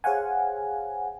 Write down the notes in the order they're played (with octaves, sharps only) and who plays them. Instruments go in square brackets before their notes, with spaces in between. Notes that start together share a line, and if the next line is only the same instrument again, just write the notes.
[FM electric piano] G#4 C5 C#5 F5 F#5 G#5